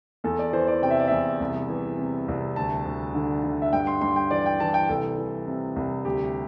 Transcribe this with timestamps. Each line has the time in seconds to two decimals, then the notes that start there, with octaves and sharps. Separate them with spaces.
0.24 E2 A4
0.39 D5
0.53 E3 C5
0.67 D5
0.82 C3 G5
0.91 E5
0.99 D5
1.08 E2 E5
1.40 C2
1.70 E3
1.98 C3
2.28 C2
2.56 D2 A5
2.86 D2
3.15 D3
3.44 D3
3.62 E5
3.73 G2 G5
3.87 C6
4.01 G2 C6
4.16 G5
4.31 E3 D5
4.46 G5
4.60 E3 A5
4.74 G5
4.89 C2 A4
5.18 E3
5.47 C3
5.76 C2
6.05 D2 G4